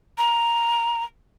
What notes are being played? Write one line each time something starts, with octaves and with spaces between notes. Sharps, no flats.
A#5